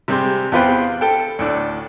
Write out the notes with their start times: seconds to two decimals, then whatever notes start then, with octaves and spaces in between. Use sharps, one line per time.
0.08 C3 G3 G#3 C4
0.52 E2 B3 F4 B4 C5 G5
1.01 A4 G5
1.39 D2 A2 D4